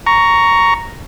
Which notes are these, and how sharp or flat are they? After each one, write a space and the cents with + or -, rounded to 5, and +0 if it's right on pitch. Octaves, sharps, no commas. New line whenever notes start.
A#5 +0 C#6 +10